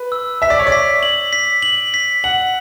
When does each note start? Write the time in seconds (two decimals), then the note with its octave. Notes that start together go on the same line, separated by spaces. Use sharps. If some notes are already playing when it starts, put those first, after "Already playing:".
Already playing: B4
0.12 E6
0.42 E5 B6
0.50 D5
0.59 C#5
0.67 D5
0.72 B6
1.03 F#7
1.33 B6
1.62 F#7
1.94 B6
2.24 F#5 F#7